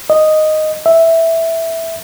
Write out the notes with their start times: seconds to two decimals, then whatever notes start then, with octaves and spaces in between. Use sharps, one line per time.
0.10 D#5
0.86 E5